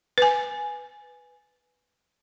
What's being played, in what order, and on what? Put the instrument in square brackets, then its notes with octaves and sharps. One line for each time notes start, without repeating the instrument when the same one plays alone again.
[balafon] B4 G#5